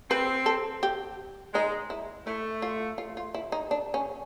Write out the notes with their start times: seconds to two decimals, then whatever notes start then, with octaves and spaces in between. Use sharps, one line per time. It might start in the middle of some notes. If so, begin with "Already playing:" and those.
0.11 C4 B4
0.46 A4
0.83 G4
1.54 G#3 D#4
1.90 E4
2.27 A3 E4
2.62 F4
2.98 F4
3.17 F4
3.34 E4
3.52 D#4
3.71 D4
3.94 C#4